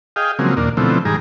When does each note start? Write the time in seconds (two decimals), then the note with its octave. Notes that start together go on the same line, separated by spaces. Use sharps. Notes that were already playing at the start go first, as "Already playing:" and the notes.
0.16 G#4 D#5 F5 G5
0.39 C#3 F3 F#3 G#3 A#3 C4
0.57 D#2 A#2 A#3 D4
0.77 B2 D3 E3 F3 A3 C4
1.05 G#2 D#3 G3 G#4 A#5